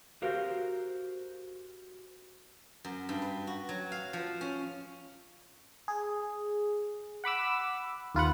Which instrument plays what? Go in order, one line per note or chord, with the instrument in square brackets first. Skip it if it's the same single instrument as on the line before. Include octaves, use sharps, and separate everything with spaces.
[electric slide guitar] F#4 G4 A#4 C5 F5
[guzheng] F#2
G2
B4
F#4
F#3
F5
F3
C#4
[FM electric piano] G#4
F#5 B5 D6 E6
D#2 F4 B4 F#5